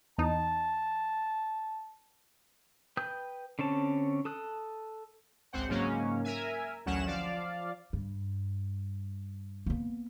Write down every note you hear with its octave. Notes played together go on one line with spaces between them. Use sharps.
E2 D#4 A5
B4 G5 D#6 G6
D3 C4 C#4 A5
A4 D#6 F#6
G#1 C#2 C4 C5 F#5
G#2 C#3 F#3 A#3 C#4
A#4 E5 G#5
A1 D2 F#3 C#4 F#5 E7
F3 D5 F5
G2
A#3 B3